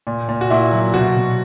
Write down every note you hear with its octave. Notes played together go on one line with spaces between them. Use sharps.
A#2
A#2
F#4
A#2 E4
F#3
B2 F#4
B2